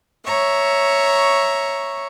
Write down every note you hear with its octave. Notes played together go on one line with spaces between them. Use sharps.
C#5 E5 A#5 C#6